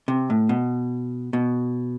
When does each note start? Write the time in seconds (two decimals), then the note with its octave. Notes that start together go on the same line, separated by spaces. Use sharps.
0.08 C3
0.30 A2
0.49 B2
1.33 B2